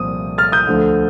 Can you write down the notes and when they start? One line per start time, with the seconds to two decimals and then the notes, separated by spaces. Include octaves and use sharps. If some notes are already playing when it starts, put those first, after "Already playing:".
Already playing: C2 A#2 F3 D#6
0.38 F6 A6
0.52 D#6 G6
0.67 D2 D3 F3